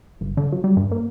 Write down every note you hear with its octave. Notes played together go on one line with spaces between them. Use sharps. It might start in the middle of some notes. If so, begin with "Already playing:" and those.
G1
D3
F#3
G3
G2
A#3